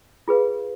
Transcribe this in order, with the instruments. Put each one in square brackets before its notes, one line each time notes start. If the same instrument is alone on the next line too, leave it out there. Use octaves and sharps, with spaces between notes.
[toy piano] F4 G#4 B4 F5